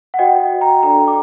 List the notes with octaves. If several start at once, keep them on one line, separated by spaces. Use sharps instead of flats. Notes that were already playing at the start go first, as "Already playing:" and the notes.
F#5
F#4 C5 D#5 G5
G5 A#5
D4 A4 D5 G5 A#5
D6